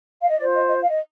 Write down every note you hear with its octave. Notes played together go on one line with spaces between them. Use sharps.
F5
D#5
F4 C5 D5
D#5
D#5
F5
D#5